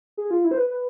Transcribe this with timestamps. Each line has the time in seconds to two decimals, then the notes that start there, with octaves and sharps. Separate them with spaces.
0.17 G#4
0.31 F4
0.44 E4
0.51 C5
0.57 B4
0.70 B4